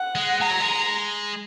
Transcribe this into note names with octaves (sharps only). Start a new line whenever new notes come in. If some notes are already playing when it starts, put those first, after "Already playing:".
Already playing: F#5
G#3
G#3 A#5
F#3
G#3